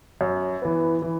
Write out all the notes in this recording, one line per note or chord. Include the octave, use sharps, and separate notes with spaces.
F#2
E3 B3
E3